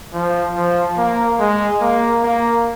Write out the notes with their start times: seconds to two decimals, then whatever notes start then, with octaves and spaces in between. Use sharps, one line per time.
0.14 F3
0.57 F3
0.98 A#3
1.40 G#3
1.81 A#3
2.23 A#3